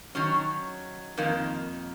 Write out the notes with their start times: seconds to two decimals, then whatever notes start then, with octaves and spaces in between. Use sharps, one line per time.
0.15 D#3 F#3 C#4
1.17 F2 D#3 A#3